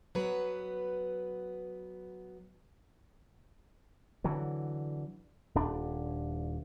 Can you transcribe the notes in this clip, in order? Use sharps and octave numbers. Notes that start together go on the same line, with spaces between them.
F#3 B3 B4
D3 E3 F#3
D#1 D4